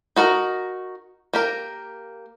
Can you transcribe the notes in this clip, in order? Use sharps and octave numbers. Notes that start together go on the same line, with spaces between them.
D#4 F#4 A#4 A#5
A#3 G4 A#4